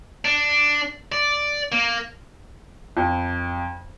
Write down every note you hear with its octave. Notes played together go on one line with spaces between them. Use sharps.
D4
D5
A#3
F2